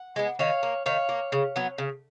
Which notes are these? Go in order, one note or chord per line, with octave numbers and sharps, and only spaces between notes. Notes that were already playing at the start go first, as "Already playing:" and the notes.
Already playing: F#5
G#3 B3
D#3 C#5 F5
A#3
D#3 C#5 F5
A#3
C#3
F#3 B3
C#3